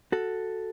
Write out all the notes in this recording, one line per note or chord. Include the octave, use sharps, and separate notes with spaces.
F#4 A4